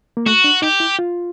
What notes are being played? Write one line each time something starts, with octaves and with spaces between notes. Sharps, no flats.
A#3
A3 F#4
D4
D#4 G4
E4
F4